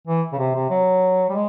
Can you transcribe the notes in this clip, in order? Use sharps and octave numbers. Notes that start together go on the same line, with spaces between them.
E3
C#3
C3
C3
F#3
G3
G#3